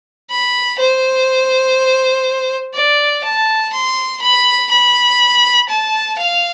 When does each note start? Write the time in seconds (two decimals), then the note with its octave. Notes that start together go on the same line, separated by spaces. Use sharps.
0.30 B5
0.79 C5
2.75 D5
3.24 A5
3.73 C6
4.21 B5
4.71 B5
5.69 A5
6.18 F5